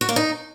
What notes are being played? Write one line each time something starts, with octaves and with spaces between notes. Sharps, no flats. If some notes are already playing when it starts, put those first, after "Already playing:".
F#4
A#3
D#4